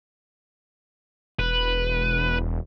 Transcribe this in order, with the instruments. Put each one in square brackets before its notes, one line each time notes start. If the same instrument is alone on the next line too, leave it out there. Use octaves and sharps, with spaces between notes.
[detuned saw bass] E1 [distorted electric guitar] B4